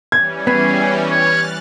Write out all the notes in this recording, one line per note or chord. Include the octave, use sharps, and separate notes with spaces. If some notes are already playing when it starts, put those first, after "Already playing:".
E3 G3 C#4 G#6
B3 G#4
C#5 F6 F#6 A6